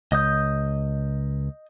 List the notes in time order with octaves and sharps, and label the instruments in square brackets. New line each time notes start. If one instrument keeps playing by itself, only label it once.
[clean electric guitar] C#2 [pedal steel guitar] D#5 D#6 G6